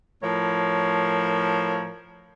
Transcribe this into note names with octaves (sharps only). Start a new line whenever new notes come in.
A2 F3 A#4 C#5